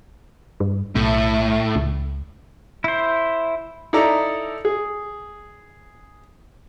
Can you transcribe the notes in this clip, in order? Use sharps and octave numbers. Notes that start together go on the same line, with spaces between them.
G2
B1 A2
C#2
E4 C5
D#4 E4 A4 D5 A#5
G#4